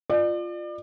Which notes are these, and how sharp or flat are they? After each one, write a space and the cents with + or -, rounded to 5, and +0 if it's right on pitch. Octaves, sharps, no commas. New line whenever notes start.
F4 +0 D5 +35